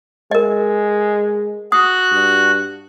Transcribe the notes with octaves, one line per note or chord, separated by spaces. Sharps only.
G#3 A#4 D#5
F#4 D#6 F#6
G2